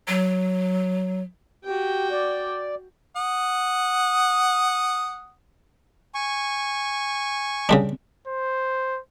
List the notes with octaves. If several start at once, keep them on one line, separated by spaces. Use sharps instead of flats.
F#3
F#4 G4 G5
D5
F#5 D#6
G#5 C#6
C#3 G3 D4
C5